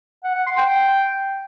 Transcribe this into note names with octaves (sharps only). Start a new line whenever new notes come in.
F#5
F#5
C6
G5